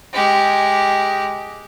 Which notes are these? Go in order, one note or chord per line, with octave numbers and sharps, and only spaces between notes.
G#3 G4